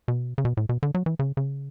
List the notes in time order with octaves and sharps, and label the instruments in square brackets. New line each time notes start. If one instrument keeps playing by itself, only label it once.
[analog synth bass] B2
C#3
B2
A2
B2
D3
F#3
E3
C#3
C#3